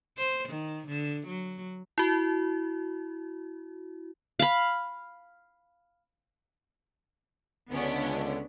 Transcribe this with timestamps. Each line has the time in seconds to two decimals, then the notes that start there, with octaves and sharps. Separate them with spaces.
0.17 C5
0.49 D#3
0.88 D3
1.28 F#3
1.98 E4 F#4
4.39 F5 B5
7.71 C#2 D3 B3 C#4 D4